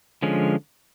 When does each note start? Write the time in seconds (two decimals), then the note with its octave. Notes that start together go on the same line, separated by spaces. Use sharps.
0.22 D3 F3 G#3 C#4